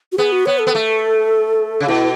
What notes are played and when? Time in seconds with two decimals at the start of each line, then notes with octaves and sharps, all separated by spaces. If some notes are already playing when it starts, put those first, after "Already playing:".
0.12 F#4
0.18 B3 G#4
0.32 F#4
0.46 B3 C#5
0.60 A4
0.67 B3
0.75 A3
1.80 C#3
1.88 B2 E4